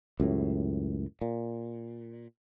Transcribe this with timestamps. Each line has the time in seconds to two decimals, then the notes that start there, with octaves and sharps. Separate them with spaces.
0.20 C#2 F#2 A2
1.21 A#2